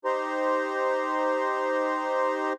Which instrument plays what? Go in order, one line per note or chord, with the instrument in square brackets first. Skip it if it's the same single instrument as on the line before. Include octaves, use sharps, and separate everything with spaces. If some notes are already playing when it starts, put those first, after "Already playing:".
[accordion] D#4 G4 C5 A#5 C6